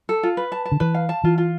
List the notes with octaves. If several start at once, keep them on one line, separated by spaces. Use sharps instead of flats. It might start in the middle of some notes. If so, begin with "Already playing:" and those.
A4
F4
B4
A5
A5
D3
E3 B4
F5
A5
E3 F4
F4